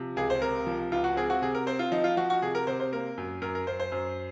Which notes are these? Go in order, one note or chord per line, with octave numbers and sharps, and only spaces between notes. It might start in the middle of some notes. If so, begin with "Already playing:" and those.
Already playing: C3 F3
C#2 G#4
C5
C3 A#4
F3
C#2 F4
F#4
C4 G#4
F#4
C3 G#4
A#4
C4 C5
F4
F3 D#4
F4
F3 F#4
F#4
C3 G#4
A#4
C3 C5
C5
A#3 A#4
F#2
F#2 A#4
A#4
F#2 C5
C5
F#2